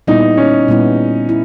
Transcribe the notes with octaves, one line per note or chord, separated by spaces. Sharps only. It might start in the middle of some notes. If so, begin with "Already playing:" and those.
A#2 G3 B3 D#4 E4
C#4
A#2 G3 B3 E4
E4